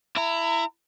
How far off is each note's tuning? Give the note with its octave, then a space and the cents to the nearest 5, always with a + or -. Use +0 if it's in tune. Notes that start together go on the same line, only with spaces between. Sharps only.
E4 +15 A#5 -25